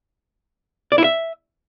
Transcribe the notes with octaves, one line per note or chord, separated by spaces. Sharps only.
D5
E4
E5